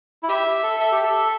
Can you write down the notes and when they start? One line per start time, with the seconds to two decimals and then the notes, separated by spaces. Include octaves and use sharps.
0.23 E4
0.28 G4 E5
0.63 A4
0.80 A4 E5
0.92 G4
1.04 A4